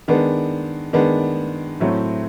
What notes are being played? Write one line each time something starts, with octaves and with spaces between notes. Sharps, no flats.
D#3 G#3 B3 D4
D#3 G#3 B3 D4
A2 F#3 A3 C4